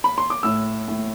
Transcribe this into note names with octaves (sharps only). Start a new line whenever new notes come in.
B5
C6
D6
A2 E6
A2